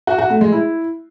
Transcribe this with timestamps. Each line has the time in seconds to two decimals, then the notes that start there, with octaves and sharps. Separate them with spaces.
0.07 F#4
0.19 F#4
0.30 A3
0.41 G#3
0.52 E4